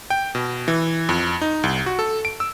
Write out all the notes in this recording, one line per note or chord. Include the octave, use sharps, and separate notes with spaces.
G5
B2
E3
F2
D#4
C2
F#4
A4
D7
E6